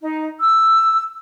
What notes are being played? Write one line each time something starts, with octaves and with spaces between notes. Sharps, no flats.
D#4
E6